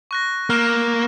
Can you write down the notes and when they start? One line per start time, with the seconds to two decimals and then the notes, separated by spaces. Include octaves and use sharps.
0.11 C#6 F#6 A#6
0.50 A#3 F6 E7